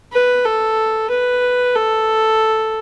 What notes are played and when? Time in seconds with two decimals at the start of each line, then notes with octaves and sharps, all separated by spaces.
0.13 B4
0.45 A4
1.10 B4
1.75 A4